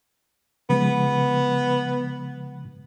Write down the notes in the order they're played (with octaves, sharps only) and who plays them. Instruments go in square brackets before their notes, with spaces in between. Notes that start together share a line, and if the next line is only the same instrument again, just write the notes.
[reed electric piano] C#3 F3 G#3 [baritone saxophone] B3